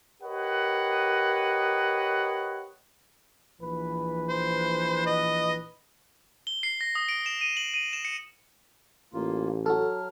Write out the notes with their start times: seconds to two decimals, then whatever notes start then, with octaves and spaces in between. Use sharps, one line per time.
0.23 G4 A#4 B4 C#5 D#5 F#5
3.62 A#1 E3 B4
4.29 C5
5.06 D#5
6.47 G7
6.63 C7
6.81 A#6
6.95 D#6
7.09 D7
7.26 E7
7.41 D#7
7.57 F#7
7.74 D#7
7.93 E7
8.05 C#7
9.14 A1 A#3 F4
9.66 F#3 F#4 A4 F6